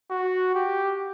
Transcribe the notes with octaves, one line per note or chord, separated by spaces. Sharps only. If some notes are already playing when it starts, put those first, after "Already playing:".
F#4
G4